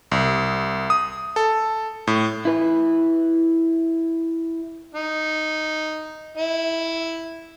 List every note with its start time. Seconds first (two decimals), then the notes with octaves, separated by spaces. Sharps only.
0.11 C2
0.90 D#6
1.36 A4
2.07 A2
2.45 E4 B4
4.94 D#4
6.38 E4